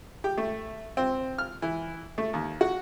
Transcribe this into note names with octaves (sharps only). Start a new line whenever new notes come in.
G4
A3
C4
F6
E3
A3
D#2
F#4